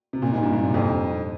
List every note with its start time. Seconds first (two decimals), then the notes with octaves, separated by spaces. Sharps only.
0.13 C3
0.22 A#2
0.32 G#2
0.43 G2
0.53 A#2
0.63 C3
0.74 F2